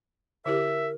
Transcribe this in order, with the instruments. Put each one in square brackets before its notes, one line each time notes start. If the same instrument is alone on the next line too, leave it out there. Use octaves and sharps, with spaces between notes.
[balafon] D3 E4 G4 [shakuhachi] A#4 [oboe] E5